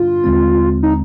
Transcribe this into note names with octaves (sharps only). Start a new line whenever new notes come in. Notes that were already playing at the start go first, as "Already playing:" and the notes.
Already playing: G2 D3 G3 D4 F4
D#2 D3 G#3 C4
D#4